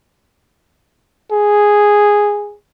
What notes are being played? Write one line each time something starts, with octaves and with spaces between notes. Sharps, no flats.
G#4